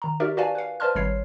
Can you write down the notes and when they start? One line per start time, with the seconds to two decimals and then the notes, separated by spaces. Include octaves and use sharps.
0.02 D#3 A#5
0.20 D#4 F#4 G4 A#4 D5 E5
0.37 F#4 B4 D5 F5 G#5 A5
0.55 B4 F5
0.80 B4 C5 D5 A5 C6 F6
0.95 G#1 G3 C#5 C7